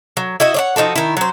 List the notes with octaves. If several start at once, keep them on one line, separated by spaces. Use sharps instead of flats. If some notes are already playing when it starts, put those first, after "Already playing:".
F#3
E4 F#4 D#5 E5
C#5 D5 F#5
F3 D#4 F#4 A4
D#3 E4
F#3 C5